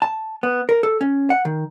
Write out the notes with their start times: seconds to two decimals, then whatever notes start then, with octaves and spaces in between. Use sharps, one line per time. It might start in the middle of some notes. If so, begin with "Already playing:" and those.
0.02 A5
0.43 B3
0.69 A#4
0.83 A4
1.01 C#4
1.30 F#5
1.45 D#3